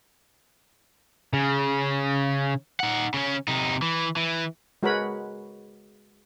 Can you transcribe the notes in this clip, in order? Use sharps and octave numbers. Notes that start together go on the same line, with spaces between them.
C#3
D#4 F#5
C#3 C#4
C3 D#4
E3
E3
G#3 F#4 A#4 B4 C#5 B5